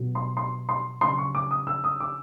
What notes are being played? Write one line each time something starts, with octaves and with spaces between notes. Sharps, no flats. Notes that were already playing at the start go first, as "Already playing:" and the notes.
Already playing: B2 F#3
C6
C6
C6
C#3 F#3 C6
C#6
D6
D#6
E6
D#6
D6